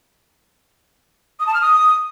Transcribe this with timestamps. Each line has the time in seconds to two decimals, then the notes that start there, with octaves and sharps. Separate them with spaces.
1.40 D#6
1.47 A5
1.54 F6
1.61 D#6